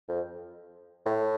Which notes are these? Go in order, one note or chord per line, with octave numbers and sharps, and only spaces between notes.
F2
A2